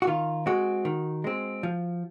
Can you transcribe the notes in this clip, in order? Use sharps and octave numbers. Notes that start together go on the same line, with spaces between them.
F#4
D#3 F4
G#3 C4 F#4
D#3
G#3 C4
F3